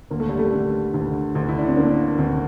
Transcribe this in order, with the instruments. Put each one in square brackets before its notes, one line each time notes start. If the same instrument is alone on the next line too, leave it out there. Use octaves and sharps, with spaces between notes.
[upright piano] D2 A#3
A3
G3
A3
D3
D2
D2
E4
D4
C4
D3 A#3
D2 C4